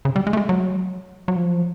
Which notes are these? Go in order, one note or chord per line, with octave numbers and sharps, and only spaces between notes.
C#3
G3
G#3
A3
G#3
F#3
F#3
F3